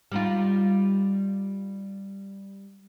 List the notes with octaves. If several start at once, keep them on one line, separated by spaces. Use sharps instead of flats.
G3 D#4 F4